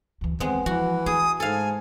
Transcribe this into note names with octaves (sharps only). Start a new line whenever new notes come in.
D2 E3
D#3 G#3 B3 C4
E3 F3 F#4
A3 G#4 D#6
G#2 A4 F5 G#5